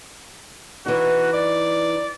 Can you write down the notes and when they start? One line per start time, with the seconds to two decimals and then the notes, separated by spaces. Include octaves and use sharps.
0.86 E3 D#4 F#4
1.33 D5